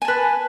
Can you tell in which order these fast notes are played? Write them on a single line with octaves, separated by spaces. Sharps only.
G#5 A5 B4